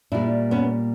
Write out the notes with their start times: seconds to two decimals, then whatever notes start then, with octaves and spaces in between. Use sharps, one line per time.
0.12 A#2 G3 D4 E4
0.51 B3 C#4